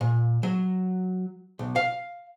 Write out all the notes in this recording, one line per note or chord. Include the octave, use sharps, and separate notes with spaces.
A#2
F#3
B1
F5